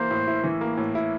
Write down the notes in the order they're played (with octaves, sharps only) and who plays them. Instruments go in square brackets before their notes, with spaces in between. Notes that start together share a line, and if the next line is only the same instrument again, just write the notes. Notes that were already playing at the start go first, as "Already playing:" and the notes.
Already playing: [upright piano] E3 A#3 [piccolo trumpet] C5
[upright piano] A2
E4
E3
A#3
A2
E4